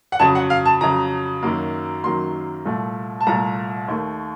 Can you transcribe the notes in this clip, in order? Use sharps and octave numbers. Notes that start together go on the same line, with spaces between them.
F#5
F2 C#3 F#3 A5
F#5
F5
A5
F2 C#3 F#3 A#5
F#2 D#3 F#3 A#3
F#2 D#3 F#3 A#3 C6
C2 A#2 A3
A5
C2 A#2 A3 A#5
D#2 D#3 A3